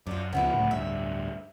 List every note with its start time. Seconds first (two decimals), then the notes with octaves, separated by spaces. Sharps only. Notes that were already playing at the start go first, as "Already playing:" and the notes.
0.07 F#2 D4 F4
0.33 C#2 C#3 F3 B3 D4 E4
0.52 D1 C#2 A2
0.71 D1 G2 E5